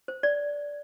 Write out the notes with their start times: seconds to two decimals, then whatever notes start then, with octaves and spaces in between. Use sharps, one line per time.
0.08 C5
0.23 D5